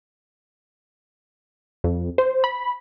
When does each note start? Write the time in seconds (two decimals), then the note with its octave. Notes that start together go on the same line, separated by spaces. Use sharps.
1.84 F2
2.18 C5
2.44 B5